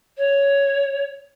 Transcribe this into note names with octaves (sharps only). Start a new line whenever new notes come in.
C#5